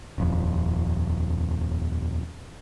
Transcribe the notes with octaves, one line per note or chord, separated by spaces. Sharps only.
D#1 F2